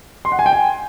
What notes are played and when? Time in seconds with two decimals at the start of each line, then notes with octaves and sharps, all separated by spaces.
0.25 C6
0.32 F#5
0.39 G#5
0.46 G5
0.53 G#5